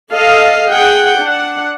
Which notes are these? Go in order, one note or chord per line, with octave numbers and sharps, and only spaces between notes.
A4 D#5 F5
G#4 F#5 G5
D4 F#5